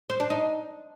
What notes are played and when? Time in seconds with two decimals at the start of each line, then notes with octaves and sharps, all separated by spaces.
0.10 C5
0.20 D4
0.30 D#4